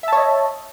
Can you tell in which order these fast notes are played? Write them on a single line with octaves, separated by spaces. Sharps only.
E5 A5 C#5 D#5